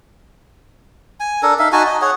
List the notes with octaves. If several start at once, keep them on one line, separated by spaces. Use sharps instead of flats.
G#5
D4 A4 A#4
D#4 E5 F5
D#4 F#4 G#5 A5
D#5
G#4 C#5 F#5